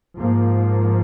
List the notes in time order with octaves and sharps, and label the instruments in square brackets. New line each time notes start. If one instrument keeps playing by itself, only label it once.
[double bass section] G#2 F3 A#3